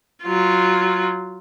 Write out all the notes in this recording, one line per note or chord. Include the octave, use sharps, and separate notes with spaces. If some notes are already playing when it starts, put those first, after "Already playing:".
F#3 F4